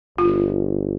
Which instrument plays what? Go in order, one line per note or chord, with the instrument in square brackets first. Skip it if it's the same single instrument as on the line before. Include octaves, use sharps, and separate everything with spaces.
[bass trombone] G1 [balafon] F4